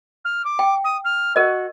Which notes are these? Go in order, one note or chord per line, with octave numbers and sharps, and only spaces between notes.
F6
D6
G5
D#6
F6
F#4 A#4 D#5